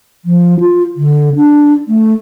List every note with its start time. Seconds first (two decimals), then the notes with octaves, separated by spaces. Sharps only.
0.25 F3
0.60 F4
0.96 D3
1.36 D4
1.88 A3